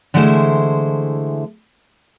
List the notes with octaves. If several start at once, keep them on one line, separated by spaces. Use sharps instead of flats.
D3 E3 G#3 A3 E4 C5